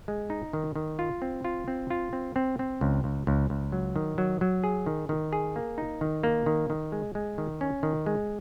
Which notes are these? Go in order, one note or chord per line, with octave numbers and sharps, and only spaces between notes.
G#3
D#4
D#3
D#3
F4
C4
F4
C4
F4
C4
C4
C4
C#2
C#2
C#2
C#2
F#3
D#3
F#3
F#3
G#4
D#3
D#3
G#4
A#3
D#4
D#3
A#3
D#3
D#3
G#3
G#3
D#3
C#4
D#3
G#3